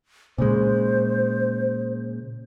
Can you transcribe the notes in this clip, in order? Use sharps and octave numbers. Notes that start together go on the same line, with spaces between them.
A#2 C#3 G#3 C5